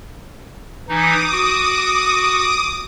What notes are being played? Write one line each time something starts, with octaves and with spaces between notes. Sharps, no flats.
E3 D#4 D6 D#6
F#4